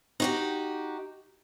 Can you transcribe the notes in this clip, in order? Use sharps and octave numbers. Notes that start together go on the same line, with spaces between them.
D#4 F#4 G4